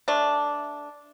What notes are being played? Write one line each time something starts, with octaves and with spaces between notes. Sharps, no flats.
A3 D4